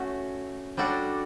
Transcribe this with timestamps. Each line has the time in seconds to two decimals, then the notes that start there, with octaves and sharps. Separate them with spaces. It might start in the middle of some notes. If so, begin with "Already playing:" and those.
Already playing: A3 C#4 F#4
0.77 G3 D4 F#4 A4 D5